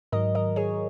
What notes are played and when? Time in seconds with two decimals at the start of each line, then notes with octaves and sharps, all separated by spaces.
0.12 G#2 D#3 F#3 A#4 D#5
0.35 A#4 D#5
0.56 G#4 C#5